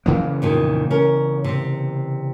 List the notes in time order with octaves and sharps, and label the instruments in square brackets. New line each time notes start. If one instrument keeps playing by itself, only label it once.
[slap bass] C#3 E3 A#3
[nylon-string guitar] F2 A#2 D#3
C#4 A#4
C3 C4